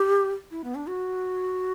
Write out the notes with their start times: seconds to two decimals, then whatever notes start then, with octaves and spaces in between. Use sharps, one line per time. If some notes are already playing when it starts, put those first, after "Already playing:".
Already playing: G4
0.51 E4
0.64 B3
0.75 D4
0.87 F#4